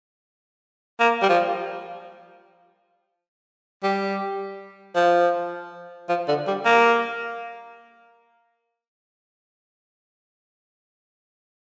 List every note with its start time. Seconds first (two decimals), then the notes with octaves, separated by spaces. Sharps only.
1.00 A#3
1.22 G3
1.29 F3
3.83 G3
4.96 F3
6.09 F3
6.28 D3
6.47 G3
6.66 A#3